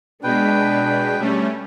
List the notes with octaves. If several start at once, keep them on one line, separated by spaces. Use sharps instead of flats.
B2 G#3 D4 B4 G5 B6
G3 A3 C#4